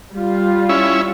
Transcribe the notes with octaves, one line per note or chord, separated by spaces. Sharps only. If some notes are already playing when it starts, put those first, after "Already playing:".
G3 F4
C#4 E4